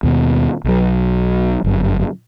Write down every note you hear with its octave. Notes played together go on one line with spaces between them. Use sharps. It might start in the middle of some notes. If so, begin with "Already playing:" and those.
D#2 B2
B1 F#3
G1 F#2